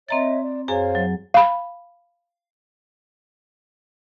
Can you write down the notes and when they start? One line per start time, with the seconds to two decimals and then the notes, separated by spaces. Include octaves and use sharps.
0.09 C4 C#5 D#5 E5 A#5 A6
0.41 D5
0.68 F#2 G#4 C5 C#5 F5 G#5
0.95 F#3
1.34 F5 B5